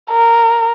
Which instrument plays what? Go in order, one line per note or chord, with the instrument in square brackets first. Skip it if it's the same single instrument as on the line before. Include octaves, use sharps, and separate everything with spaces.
[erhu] A#4